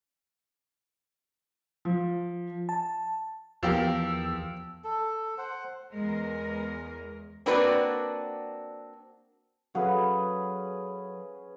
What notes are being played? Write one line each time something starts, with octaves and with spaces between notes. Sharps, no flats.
F3
A5
E2 F3 A#3 G4 F5 E6
A4
C5 F#5
E2 G#3 A#4
A#3 C4 D4 F#4 B4 D5
F#3 C#4 G#4 A4 B4 F5 F#5